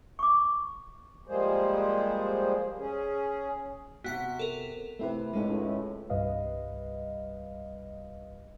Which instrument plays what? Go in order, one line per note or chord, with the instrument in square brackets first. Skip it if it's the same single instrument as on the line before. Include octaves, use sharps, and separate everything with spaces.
[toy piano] C#6 D6
[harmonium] F3 G3 G#3 A#3 G#4 C5
C#4 G#4
[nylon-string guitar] C3 F#4 [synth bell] B3 F#5 B6
[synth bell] A4 A#4
[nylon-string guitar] C3 C4 [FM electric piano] A3 E4 B4
[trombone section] C#2 A2 [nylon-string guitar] G#3 C#4 D#4
[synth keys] C2 G2 G3 B4 D#5 F5